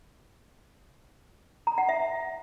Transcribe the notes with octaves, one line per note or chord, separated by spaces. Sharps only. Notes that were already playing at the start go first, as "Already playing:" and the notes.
A#5
F#5
E5